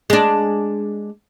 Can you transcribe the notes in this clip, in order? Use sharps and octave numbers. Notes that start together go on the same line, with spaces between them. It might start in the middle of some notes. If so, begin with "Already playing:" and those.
G#3 D4